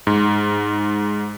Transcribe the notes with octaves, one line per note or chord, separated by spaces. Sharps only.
G#2